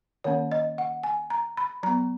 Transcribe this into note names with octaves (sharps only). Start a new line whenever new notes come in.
D#3 A#3 C#4 C#5
D#5
F#5
G#5
A#5
B5
F#3 B3 A#5